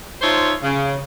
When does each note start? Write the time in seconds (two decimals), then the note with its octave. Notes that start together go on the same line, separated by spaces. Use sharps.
0.22 D#4 F4 C5 C#5 E5 A5
0.62 C#3